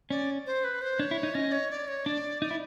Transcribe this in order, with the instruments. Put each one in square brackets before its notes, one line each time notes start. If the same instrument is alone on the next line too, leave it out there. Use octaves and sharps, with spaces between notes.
[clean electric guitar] C#4 [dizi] D5
[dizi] C5
B4
C5
[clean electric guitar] D4 [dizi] C#5
[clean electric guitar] E4
D#4
[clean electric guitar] C#4 [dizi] D#5
[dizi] C#5
D5
C#5
[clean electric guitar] D4 [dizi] D5
[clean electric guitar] D#4 [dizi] D5
[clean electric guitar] E4